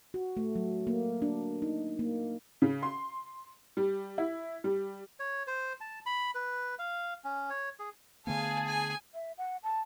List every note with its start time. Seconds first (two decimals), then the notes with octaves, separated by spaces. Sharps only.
0.14 F#4
0.37 A3
0.56 F#3
0.87 A#3
1.22 D4
1.62 D#4
1.99 A#3
2.62 C#3
2.83 C6
3.77 G3
4.18 E4
4.64 G3
5.20 C#5
5.47 C5
5.81 A5
6.06 B5
6.35 B4
6.79 F5
7.24 C#4
7.50 C#5
7.79 G#4
8.27 D3 A3 B3 G#4 F5 G#5 A5
8.67 G#5
9.14 E5
9.38 F#5
9.63 A5